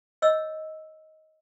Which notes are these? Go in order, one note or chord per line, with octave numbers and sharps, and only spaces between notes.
C#5 D#5 E6